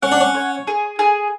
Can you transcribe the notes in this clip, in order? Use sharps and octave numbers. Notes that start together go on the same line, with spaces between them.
C#4 F#5
D4
C#4
C#5
G#4
G#4